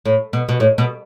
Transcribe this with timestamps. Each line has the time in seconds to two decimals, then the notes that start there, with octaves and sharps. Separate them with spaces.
0.05 A2
0.33 B2
0.49 B2
0.60 A2
0.78 B2